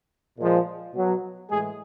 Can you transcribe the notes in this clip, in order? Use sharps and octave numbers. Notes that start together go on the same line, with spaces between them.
A#2 F3 G#3
B2 F#3
A2 E3 G#3 G#4